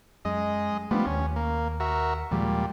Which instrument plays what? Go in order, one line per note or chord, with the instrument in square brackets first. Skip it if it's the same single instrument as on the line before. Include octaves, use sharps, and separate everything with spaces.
[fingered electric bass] F#2 [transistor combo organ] G#3 D#5
[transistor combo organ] F3 G3 B3 [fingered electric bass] A3 D4
[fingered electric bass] D#2 [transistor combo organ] C#4
[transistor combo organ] A#3
F#4 A#4 E5
[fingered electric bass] D#2 F3 G#3 [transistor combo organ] A#2 G3